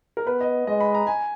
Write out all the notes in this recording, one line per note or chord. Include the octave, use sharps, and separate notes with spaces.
A#4
B3 B4
D#5
G#3 D#5
B5
A#5
G#5